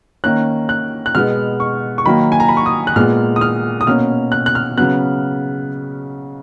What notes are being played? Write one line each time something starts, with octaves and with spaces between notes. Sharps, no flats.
D#3 A#3 C#4 F#6
F#6
F#6
B2 G#3 B3 F6
C#6
C#6
D#3 F#3 A#3 B5
G#5
A#5
B5
C#6
D#6
F#6
A#2 G#3 B3 F6
D#6
F6
D#6
B2 A#3 C#4 F6
F#6
F#6
F6
C#3 F#3 B3 F#6